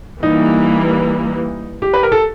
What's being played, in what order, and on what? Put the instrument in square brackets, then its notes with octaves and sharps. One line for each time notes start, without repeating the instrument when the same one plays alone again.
[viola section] E3 G3 A#3 [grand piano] D#4
[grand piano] G4
B4
A#4
A4